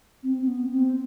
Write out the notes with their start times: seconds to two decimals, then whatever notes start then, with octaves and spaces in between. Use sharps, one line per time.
0.23 C4
0.41 C4
0.47 B3
0.70 C4